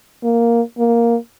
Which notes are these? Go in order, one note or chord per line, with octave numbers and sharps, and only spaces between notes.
A#3
A#3